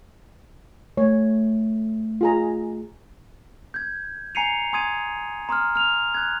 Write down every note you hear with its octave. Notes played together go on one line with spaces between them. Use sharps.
A3 C#5
F4 G#4 A#5
G6 G#6
G#5 A#5 C7 C#7 D#7 F7
G#5 C6 D#6 G#6 D#7
A#5 C6 D#6 F6
F6 F7
F#6 G#6